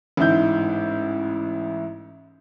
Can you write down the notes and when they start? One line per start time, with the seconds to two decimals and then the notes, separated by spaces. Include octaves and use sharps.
0.17 A1 G#2 E4 G6